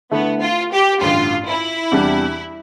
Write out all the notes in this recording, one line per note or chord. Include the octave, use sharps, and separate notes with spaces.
D3 A3 B3 E4
F4
G4
A1 G2 D3 F4
E4
E2 C3 G3 D4 G4